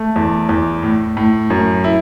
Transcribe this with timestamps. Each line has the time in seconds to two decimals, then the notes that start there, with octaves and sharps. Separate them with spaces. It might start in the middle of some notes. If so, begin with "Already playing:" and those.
Already playing: A3
0.16 E2
0.49 E2
0.83 A2
1.17 A2
1.50 F#2
1.84 E4